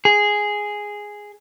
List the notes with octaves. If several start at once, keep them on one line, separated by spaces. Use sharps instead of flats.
G#4